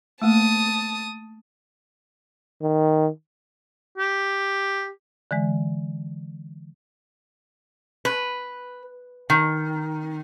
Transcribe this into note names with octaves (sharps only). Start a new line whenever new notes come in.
A3 A#3 A5 D#6
D#3
G4
D3 E3 G#3
B4
D#3